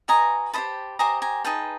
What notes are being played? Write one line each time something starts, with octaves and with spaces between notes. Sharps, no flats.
F#4 B4 D#5 G#5 A#5
G4 C5 D#5 A5 B5
G4 C5 D#5 G#5 A#5
G#5 A#5
D#4 G#4 B4 G5 A5